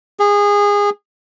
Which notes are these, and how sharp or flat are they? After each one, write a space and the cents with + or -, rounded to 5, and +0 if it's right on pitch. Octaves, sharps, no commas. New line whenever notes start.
G#4 -25